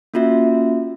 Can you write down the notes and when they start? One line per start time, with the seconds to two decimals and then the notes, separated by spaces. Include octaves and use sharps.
0.14 A#3 C#4 F4 F#4 E5